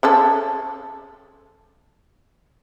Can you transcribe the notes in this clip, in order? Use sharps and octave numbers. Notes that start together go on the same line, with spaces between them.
C#3 C#4 A4